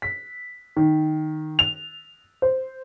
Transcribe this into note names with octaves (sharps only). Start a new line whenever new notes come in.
B6
D#3
F7
C5